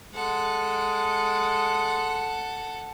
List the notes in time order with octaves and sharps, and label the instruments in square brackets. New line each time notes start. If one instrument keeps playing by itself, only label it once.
[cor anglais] G#3 [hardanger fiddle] A4 F#5